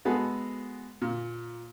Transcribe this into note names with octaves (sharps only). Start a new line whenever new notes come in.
G#3 B3 F#4 G#4 A4
A#2